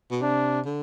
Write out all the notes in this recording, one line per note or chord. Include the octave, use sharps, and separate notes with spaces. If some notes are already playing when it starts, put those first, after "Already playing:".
B2
C3 D4
D3